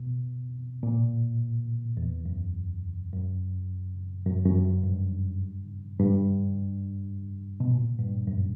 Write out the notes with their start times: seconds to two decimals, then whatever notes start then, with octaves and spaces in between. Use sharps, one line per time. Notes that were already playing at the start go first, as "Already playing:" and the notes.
Already playing: B2
0.83 A#2
1.97 E2
2.25 F#2
3.13 F#2
4.27 F#2
4.46 F#2
4.65 F#2
4.84 G2
5.99 G2
7.60 B2
7.70 A#2
7.99 G2
8.27 F#2